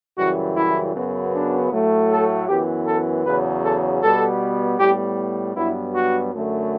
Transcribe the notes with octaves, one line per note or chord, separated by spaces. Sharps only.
F#2 C#3 E3 G3 F#4
E4
F#2 C#3 F#3 B3
D4
A2 F#3 A3
A4
F#2 E3 B3 G4
A4
E2 C#3 F#3 B4
A4
B2 G3 B3 A4
A2 G3 B3 G4
G2 F#3 B3 E4
F#4
F#2 D3 A3